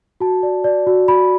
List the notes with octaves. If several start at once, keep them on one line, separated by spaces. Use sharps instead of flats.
F#4 A5
D5
D5
F#4
F#4 B5